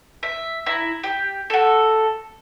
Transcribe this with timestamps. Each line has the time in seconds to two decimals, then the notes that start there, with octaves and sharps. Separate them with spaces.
0.23 E5
0.66 E4 A#5
1.04 G4
1.50 F#4 A4